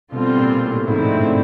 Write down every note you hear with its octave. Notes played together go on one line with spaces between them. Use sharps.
B2 D3 G3 C4 F4
A#2
A2
G#2 D3 F3 A3 C4 E4
G2